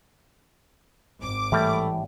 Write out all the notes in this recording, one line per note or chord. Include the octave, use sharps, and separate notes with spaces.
G#1 D6
A2 E3 G3 A3